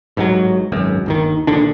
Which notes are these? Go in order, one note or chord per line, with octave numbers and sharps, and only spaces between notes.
A1 G#2 D#3 F#3
G#1 C#2 F#2
G1 D#2 D#3
D#1 A#1 D3 D4